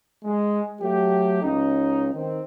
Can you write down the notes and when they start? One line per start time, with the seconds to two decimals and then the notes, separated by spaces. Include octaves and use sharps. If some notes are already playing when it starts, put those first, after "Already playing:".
0.24 G#3
0.82 F#3 A3 G4
1.42 C#2 C#4 D#4
2.14 D#3 C4